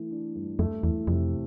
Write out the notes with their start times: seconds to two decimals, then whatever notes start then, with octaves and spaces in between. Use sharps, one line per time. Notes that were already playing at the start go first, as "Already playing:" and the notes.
Already playing: E3 A3
0.11 D4
0.35 G2
0.59 F2 A3
0.83 E2 E3
1.07 F2 C3